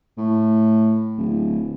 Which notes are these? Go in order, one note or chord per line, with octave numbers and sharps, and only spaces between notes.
A2
D1